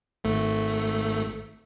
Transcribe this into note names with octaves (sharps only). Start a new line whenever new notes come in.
G#1 A3